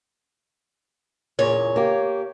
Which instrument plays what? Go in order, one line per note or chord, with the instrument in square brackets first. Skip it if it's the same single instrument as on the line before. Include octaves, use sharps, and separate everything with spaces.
[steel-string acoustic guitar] E2 A#2 C#3 [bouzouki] C#5
[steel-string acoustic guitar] A#3 G4